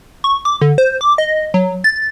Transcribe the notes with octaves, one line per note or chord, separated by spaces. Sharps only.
C#6
D6
D3
C5
D6
D#5
F#3
A6